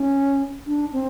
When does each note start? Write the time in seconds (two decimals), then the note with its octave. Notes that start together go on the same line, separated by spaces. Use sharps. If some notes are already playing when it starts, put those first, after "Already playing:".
Already playing: C#4
0.67 D4
0.93 C4